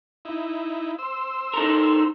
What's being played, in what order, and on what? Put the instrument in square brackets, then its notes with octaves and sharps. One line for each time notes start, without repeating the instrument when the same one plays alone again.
[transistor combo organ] D#4 E4
C5 E6
[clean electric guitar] D#4 A4 A#4